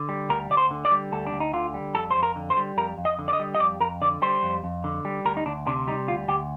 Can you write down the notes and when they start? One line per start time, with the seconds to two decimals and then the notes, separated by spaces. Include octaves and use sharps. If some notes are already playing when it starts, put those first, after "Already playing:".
Already playing: D3
0.09 G3
0.29 D2 A#4
0.50 D2 D5
0.57 C5
0.71 D3
0.85 D5
0.91 G3
1.12 D2 A4
1.27 D4
1.33 D2
1.40 D#4
1.53 D3 F4
1.74 G3
1.95 F2 A4
2.11 C5
2.16 F2
2.23 A#4
2.36 D3
2.50 C5
2.57 G3
2.77 F2 A#4
2.98 F2
3.05 D#5
3.19 D3
3.28 D5
3.33 D#5
3.40 G3
3.55 D#5
3.60 F2 D5
3.81 F2 A#4
4.02 D3 D5
4.22 G3 C5
4.43 F2
4.64 F2
4.84 D3
5.05 G3
5.25 D2 A#4
5.37 D#4
5.46 D2 D4
5.67 C3 D4
5.88 G3 D#4
6.08 D2 F4
6.28 D2 G4